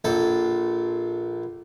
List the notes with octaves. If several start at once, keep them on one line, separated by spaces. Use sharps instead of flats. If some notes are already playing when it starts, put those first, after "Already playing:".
A#1 A4